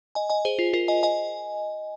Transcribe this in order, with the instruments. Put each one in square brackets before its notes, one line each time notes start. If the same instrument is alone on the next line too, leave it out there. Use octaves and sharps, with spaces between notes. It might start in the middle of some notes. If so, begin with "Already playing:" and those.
[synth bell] D#5 G#5
D#5 G#5
G#4 C5
F4
F4 A#4
D#5 G#5
D#5 G#5